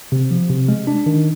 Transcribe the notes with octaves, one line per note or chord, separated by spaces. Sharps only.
C3
F3
C3
G#3
D4
D#3